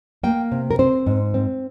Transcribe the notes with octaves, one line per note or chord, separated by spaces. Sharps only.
A#3 G5
C3
A#4
C4 C5
G#2
C4